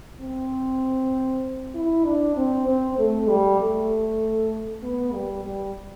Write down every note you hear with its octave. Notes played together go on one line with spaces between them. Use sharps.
C4
E4
D4
C4
C4
A3
G3
A3
B3
G3
G3